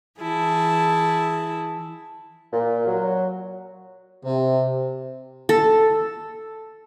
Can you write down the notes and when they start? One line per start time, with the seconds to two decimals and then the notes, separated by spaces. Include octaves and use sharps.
0.20 E3 E4 G#4 A5
2.53 A#2
2.87 F#3
4.25 C3
5.49 A4